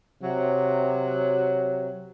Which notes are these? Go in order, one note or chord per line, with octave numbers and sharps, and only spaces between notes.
C3 F#3